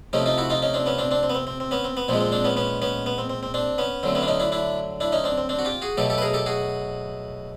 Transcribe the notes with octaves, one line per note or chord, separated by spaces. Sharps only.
C3 F3 A3 C#4 D#4
D#4 F4
E4 F#4
D#4 F4
C#4 D#4
C4 D4
B3 C#4
C4 D4
C4 D4
C4
B3
C4
C4
C4
B3 C#4
C4
B3
A#2 F3 G#3 C4
C4
C4 D4
B3 C#4
B3 C#4
B3 C#4
B3
C4
C4
C4
C4 D4
B3 C#4
D3 F#3 A3 C4
B3 C#4
D4
C#4 D#4
D4 E4
D4 E4
D4 E4
C#4 D#4
C4 D4
C4
C4 D4
F#4
F4 G4
F#4 G#4
B2 F#3 A3 G4 A4
G4 A4
B4
G#4 A#4
G4 A4
F#4 G#4